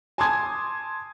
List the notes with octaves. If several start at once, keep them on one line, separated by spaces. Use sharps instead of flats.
G#5 A5 C6 D6 D#6 G#6